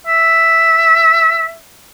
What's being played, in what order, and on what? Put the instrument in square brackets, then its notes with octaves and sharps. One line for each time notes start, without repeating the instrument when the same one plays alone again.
[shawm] E5